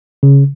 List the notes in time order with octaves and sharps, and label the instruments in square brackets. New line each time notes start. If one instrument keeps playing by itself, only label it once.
[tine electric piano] C#3